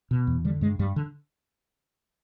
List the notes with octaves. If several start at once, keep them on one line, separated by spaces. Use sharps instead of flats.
B2
E2
D3 G3
G2 G#3
G2 G3
D3